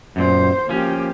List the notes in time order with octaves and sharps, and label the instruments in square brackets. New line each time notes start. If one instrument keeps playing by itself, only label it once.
[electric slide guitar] F#2 A#2 [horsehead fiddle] B3 C5
[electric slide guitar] F3 C#4 [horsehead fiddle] A#3 G4